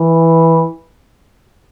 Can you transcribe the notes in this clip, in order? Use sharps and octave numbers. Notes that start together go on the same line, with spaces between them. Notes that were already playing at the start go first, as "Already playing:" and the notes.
Already playing: E3